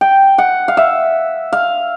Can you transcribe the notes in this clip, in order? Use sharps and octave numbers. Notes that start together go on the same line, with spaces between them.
G5
F#5
F5
E5
F5